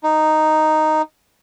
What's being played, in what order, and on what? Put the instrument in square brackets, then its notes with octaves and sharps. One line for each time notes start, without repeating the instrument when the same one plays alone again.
[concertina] D#4